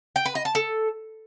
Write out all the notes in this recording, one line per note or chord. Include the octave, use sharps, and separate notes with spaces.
G5
B4
D#5
A5
A4